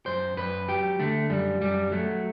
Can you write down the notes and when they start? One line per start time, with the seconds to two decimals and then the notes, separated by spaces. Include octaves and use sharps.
0.06 F#2 C5
0.37 F#2 B4
0.68 F#3 G4
0.99 D3 A3
1.30 F#2 G3
1.61 F#2 G3
1.92 F#3 A3